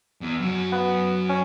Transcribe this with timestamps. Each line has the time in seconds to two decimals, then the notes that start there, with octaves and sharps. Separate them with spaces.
0.21 E2
0.40 F#2 F#4
0.72 B3
1.29 C#4